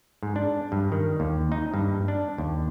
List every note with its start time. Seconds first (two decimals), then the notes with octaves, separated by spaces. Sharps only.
0.23 G#2
0.36 D4
0.72 G2
0.92 D#3
1.20 D#2
1.52 D#4
1.74 G2
2.08 D4
2.38 D#2